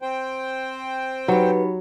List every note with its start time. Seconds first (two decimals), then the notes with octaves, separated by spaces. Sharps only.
0.02 C4 C5 G5
1.28 F#3 D#4 G4 B4 B5